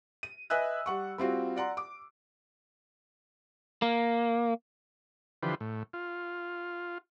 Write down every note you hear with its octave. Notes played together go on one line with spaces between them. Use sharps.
D#7
B4 D#5 E5 G#5 E6 F#6
G3 F#5 C#6
G3 C4 F4 F#4
D5 F#5 A#5 C6
D6
A#3
D3 E3 F3 G4 B4 C5
A2
F4